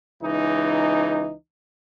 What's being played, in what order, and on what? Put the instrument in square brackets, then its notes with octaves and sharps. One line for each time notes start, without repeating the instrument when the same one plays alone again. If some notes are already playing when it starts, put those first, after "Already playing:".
[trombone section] C#2 E3 D#4